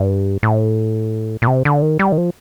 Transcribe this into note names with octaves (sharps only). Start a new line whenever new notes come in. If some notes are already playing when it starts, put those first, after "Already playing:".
Already playing: G2
A2
A#2
C3
D3
D#3
G3
D#3
F3